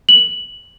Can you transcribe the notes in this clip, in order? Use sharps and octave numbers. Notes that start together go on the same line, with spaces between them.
F#7